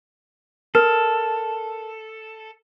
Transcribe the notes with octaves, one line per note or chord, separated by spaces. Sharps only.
A4 A#4 F6